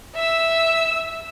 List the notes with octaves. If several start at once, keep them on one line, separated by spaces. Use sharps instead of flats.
E5 E6